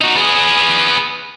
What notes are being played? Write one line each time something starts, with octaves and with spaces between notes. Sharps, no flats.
D#4 F#4
B3 G#4